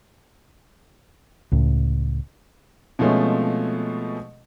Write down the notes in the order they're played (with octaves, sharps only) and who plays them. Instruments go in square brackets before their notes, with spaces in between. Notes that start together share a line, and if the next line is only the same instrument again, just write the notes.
[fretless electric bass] C#2 A2
[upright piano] B2 F3 G#3 A3 C4 C#4